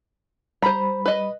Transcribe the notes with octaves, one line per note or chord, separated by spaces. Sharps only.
G3 C5 A#5 B5
B4 D#5